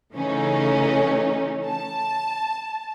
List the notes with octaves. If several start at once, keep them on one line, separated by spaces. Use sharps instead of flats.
C#3 E3 A3 C#4 D#4
A5